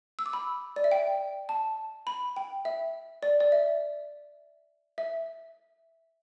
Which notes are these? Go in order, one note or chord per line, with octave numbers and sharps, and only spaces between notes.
E6
D6
B5
D5
E5
G5
A5
B5
G5
E5
D5
D5
E5
E5